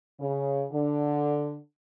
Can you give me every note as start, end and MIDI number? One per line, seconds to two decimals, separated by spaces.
0.20 0.65 49
0.72 1.55 50